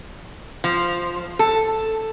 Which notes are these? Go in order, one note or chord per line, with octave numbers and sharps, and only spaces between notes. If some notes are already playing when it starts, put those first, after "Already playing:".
F3
A4